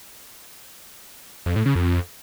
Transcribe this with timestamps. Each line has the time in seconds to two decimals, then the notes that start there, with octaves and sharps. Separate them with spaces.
1.46 F2
1.56 A2
1.66 C#3
1.75 F2